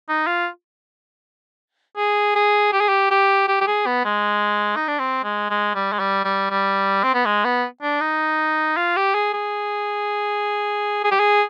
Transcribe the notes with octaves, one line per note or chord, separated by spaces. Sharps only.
D#4
F4
G#4
G#4
G4
G#4
G4
G4
G4
G4
G#4
B3
G#3
D#4
D4
C4
G#3
G#3
G3
G#3
G3
G3
G3
C4
B3
G#3
B3
D4
D#4
F4
G4
G#4
G#4
G#4
G4
G#4